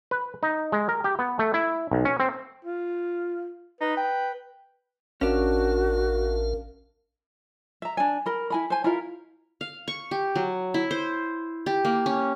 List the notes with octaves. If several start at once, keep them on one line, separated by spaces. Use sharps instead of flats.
B4
D#4
G#3
A#4
G4
B3
A3
E4
B1
C#4
C4
F4
D#4 B4
G5
A1 C#4 D4 F#4 A#4 F5
E5 A#5
D4 G#5
A#4 B5
E4 G#5 B5
C5 G#5
E4 F4 A#4 F5
F5
C#6
G4
F#3
E4
C5
G4
A#3
C#4